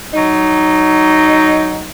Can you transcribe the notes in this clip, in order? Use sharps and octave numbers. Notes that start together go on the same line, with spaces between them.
F#3 D#4